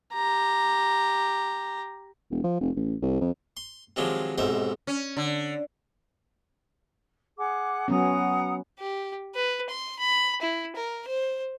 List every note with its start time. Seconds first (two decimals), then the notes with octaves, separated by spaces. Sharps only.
0.14 G4 A#5
2.31 E1
2.44 F3
2.60 F1
2.76 A1
3.02 C2
3.21 F2
3.57 C6
3.96 C3 D#3 F3 F#3 G#3 D4
4.38 B1 G#2 C3 C5 E5
4.87 C#4
5.17 D3
7.37 G#4 F#5 D6
7.88 F#3 B3 C#4 F#5 A#5 D#6
8.79 G4
9.35 B4
9.69 C6
9.99 B5
10.42 E4
10.76 A#4
11.08 C5